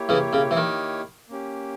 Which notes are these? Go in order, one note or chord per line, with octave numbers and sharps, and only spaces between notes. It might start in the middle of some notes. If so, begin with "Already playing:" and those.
Already playing: A#3 E4 G4 C#5
C#3 E3
C#3
E3
D#3
A#3 C#4 G4